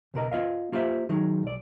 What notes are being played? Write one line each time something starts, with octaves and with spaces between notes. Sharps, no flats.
C#2 B2 A#4 D#5
B3 F4 D#5 F5
A#3 F4 G4 C5 E5
D#3 F#3 G#3 D#4
B1 D5